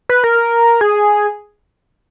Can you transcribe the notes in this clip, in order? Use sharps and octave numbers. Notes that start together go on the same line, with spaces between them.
B4
A#4
G#4